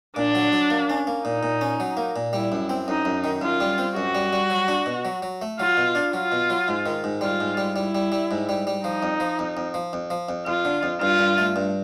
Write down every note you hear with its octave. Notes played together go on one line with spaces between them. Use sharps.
A#2 D4
F#3
F#3
A#3
C#4
A#3
A#2 D#4
A#2
C#4
F#3
A#3
A#2
G3 E4
F#2
C4
F#2 D#4
F#2
D#3
F#2 F4
G3
C4
F#2 F#4
G3
G3
F#3
D4
B2
F#3
F#3
A3
F#3 F4
B2
D4
F#3 F4
B2
F#3
G#2
D#3
G#2
G3 F4
G#2
G3
G3 E4
G3
G3
G#2
G3
G3
F3 D#4
F2
F3
F2
F2
F3
F2
F3
F2
F2 F4
D3
F2
G2 F4
G2
A3
G2